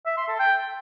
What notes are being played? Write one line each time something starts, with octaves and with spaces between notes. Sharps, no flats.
E5
C6
A4
G5